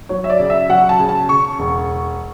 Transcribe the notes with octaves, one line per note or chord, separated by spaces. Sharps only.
F#3 C#5
E5
D5
C#3
E5
F#3 F#5
A5
C#3
A5
C#3 C#6
E1